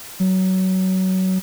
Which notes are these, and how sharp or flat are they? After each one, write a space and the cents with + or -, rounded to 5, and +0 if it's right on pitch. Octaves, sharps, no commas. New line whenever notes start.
F#3 +20